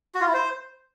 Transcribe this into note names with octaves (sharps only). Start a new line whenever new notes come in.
F#4
F4
E4
C5